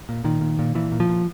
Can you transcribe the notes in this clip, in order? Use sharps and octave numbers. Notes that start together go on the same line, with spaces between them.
A#2
A#2 D#3
A#2
A#2
A#2 E3
A#2
F3
A#2